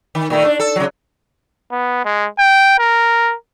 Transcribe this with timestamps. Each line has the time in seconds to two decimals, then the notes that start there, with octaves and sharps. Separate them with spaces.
0.15 D#3
0.30 A#2 D#3 A3
0.45 D4
0.60 A4
0.76 C#3 F#3
1.71 B3
2.05 G#3
2.39 G5
2.79 A#4